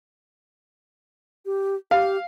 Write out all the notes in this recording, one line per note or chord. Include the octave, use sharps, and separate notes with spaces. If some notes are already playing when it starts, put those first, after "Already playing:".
G4
G4 F5